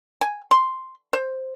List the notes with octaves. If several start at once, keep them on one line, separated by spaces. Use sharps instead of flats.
G#5
C6
C5